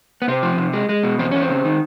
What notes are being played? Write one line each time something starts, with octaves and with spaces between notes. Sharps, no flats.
B3
C3 C4
F3
C3
G#3
G#3
B2
E2 C4
E2 C#4
C4
C#3
D#3